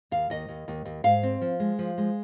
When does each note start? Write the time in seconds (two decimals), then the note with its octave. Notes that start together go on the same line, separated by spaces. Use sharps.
0.11 D#2 F5
0.30 D#2 D#5
0.49 D#2
0.68 D#2
0.85 D#2
1.04 G#2 F5
1.23 C4
1.41 F3
1.60 G#3
1.79 F3
1.98 G#3